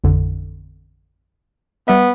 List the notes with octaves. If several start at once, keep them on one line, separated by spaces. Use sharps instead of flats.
A1 F2 D3
G3 B3 E5